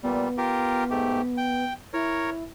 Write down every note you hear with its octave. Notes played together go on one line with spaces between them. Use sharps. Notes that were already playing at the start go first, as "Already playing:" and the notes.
A#2 G3 B3
F4 G4 A#4
G#2 A3 G4
G5
E4 A#4 C#5